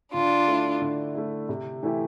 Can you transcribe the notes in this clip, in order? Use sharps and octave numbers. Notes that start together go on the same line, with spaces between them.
D3 D4 F4
A3 E4
D3
A3 E4
C3
E3 A3 E4 G4